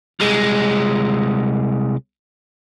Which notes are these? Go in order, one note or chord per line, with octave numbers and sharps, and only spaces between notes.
C2 G#3